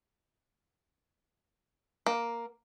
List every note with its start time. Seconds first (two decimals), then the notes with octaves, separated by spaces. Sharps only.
2.06 A#3